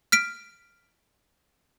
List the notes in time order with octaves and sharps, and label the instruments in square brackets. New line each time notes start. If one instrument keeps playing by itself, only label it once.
[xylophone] F6 B6 D7